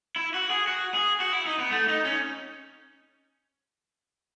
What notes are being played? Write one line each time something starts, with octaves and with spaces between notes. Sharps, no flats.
E4
F#4
G#4
F#4
G#4
F#4
E4
D#4
B3
A3
D#4
C#4